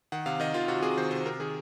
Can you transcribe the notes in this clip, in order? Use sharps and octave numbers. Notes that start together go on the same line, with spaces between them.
D#3 F#5
C3 F5
D#3 D#5
D#3 F4
C3 F#4
C3 G#4
D#3 C5
C3 C5
C3 A#4
D#3 G#4